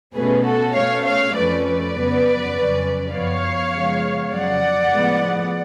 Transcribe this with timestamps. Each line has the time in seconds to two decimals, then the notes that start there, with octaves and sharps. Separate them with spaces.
0.15 B2 A3 C#4 G#4 B4
0.45 F#4 A4
0.74 B2 A3 C#4 C#5 F5
1.05 C#5 F5
1.34 F2 F3 A3 C#4 B4 D5
1.64 B4 D5
1.94 F2 C#3 F#3 B3
2.53 F2 C#3 F#3 C#4
3.13 F#2 F3 B3 C#5 F5
3.73 C#3 F3 G#3 B3
4.33 F2 C#3 F#3 D5 F#5
4.92 A2 F3 G#3 B3